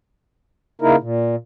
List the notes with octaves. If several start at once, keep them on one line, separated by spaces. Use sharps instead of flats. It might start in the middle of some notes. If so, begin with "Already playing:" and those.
C#3 A#3 D#4 E4 A#4
A#2